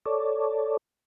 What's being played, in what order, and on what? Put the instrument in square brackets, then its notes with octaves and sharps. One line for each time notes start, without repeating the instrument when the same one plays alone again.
[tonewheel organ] A4 C#5 D5